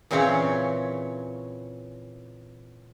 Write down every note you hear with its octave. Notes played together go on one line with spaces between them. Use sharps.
A#2 C#3 E3 C4 C#5